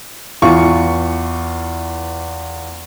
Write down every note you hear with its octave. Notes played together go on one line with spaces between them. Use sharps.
E2 E3 F4 C#6